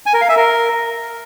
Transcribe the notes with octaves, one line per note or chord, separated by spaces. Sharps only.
G#5
A#4
F5
E5
A#4